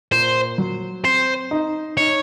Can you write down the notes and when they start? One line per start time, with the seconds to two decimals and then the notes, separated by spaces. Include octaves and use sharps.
0.12 A#2 C5
0.58 F#3
1.04 C4 C5
1.51 D#4
1.97 D#4 C#5